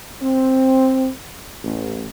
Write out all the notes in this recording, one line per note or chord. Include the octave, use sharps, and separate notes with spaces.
C4
A1